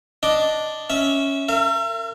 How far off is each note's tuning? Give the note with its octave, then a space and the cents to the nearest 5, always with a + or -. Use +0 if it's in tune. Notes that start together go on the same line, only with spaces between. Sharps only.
D4 +0 D#5 +0 D6 +0
C#4 +0 E5 -20
A#4 -35 E5 +40